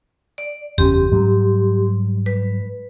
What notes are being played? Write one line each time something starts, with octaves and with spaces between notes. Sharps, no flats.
D5
F#1 E2 C#4 G4 C6
G#2 F#3 G3
B4